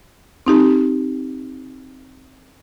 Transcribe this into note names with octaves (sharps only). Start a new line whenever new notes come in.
C4 D#4 G4